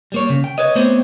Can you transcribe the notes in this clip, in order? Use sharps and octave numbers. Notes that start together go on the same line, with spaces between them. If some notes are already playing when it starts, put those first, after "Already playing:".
G3 A#3 C#5
C#3
G5
B4 C#5 D#5
A3 B3 C4 G4 C5 C#5